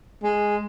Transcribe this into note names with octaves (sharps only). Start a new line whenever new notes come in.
G#3